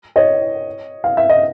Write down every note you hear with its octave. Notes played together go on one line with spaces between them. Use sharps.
C#5 D#5
F5
E5
D#5